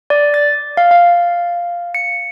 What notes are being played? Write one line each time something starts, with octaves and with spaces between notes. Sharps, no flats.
D5
A6
F5
F5
C#7